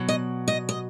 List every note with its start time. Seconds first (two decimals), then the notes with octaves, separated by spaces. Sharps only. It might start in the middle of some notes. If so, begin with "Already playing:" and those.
Already playing: B2 F#3
0.09 D#5
0.48 D#5
0.69 D#5